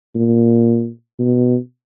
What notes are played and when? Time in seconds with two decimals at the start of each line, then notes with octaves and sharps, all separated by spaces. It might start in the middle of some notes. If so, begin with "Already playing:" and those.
0.15 A#2
1.19 B2